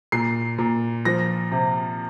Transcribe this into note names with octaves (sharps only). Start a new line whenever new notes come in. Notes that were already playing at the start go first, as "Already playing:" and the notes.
A#2 C7
A#2
F3 A#6
C3